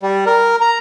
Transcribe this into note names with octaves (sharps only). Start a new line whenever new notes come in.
G3
A#4
A#5